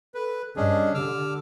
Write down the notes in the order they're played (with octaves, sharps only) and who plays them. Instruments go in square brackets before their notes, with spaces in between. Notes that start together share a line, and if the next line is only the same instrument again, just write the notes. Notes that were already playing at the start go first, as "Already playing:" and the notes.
[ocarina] A4 [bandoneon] B4
[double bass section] G2 [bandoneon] C#4 D4 G#4 [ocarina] D#5
[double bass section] D3 [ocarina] G4 [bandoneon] D6 E6 F6